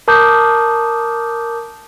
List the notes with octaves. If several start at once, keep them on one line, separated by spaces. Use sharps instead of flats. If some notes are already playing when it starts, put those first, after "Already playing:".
A#4 A5 D6 D#6 G6